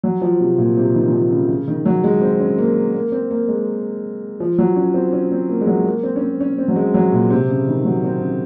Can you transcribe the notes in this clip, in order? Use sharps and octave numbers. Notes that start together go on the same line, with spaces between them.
F#3
F3
C3
A#2
C3
D#3
D#3
F3
C#3
C#3
D#3
F#3
G#3
C4
C#4
A#3
A#3
C4
A#3
G#3
F3
F#3
C#4
C4
C#4
C4
A#3
G#3
F#3
A#3
C4
C#4
C4
C#4
C4
F#3
G#3
F#3
A#2
C3
C#3
D#3
F#3
C4
C#3